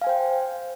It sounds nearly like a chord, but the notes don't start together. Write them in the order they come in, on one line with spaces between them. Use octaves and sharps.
F5 G#5 C5 G5